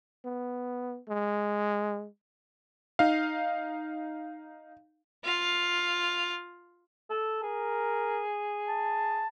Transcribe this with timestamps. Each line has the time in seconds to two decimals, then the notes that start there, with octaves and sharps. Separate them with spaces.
0.25 B3
1.09 G#3
2.99 D#4 F5
5.25 F4 F5
7.10 A4
7.43 G#4 A#4
8.69 A5